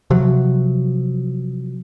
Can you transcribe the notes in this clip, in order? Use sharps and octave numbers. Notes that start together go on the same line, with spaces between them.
C3 F3 F#3